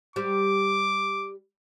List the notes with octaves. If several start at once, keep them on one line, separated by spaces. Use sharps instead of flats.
G3 G4 C5 D6